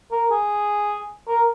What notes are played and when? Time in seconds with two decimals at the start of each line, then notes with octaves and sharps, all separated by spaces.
0.12 A#4
0.31 G#4
1.28 A#4